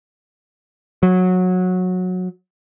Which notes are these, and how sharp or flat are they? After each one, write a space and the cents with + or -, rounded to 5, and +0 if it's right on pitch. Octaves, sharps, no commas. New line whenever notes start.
F#3 -15